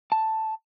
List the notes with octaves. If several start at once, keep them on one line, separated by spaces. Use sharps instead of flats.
A5